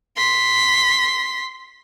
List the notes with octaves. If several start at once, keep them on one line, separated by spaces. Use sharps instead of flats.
C6 B6